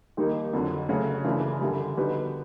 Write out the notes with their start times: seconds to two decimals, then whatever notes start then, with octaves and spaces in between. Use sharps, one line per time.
0.17 D#2 D#3 G3 A#3 D#4
0.53 F2 D3 F#3
0.89 C#3 F#3 A3 C#4 F#4
1.24 F#2 C#3 E3 A3 D4
1.61 F#2 D3 G3
1.96 D3 G3 B3 D#4 F#4